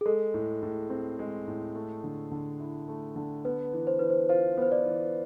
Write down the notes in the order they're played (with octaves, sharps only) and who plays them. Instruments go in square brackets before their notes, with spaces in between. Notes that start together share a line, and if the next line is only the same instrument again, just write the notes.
[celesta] G#4
[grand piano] G#3 [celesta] A4
[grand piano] A2
A2
C4
G#3
A2
A3
D3
D3
E4
A3
D3
[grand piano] B3 [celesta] B4
[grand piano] E3
[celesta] C5
[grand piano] E3 [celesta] B4
[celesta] C5
[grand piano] F4 [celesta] C5
[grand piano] B3 [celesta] C5
[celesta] D5
[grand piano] E3